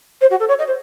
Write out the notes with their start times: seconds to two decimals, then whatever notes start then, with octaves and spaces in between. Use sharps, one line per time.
0.21 C5
0.30 F#4
0.40 A4
0.48 C#5
0.59 D#5
0.67 C5